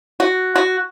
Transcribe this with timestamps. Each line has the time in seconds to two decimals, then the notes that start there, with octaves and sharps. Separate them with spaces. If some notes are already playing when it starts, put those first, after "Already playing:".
0.20 F#4
0.56 F#4